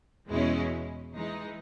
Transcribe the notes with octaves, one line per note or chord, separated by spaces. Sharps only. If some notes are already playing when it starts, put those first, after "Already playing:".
E2 B2 G#3 C#4 E4
E3 G#3 D#4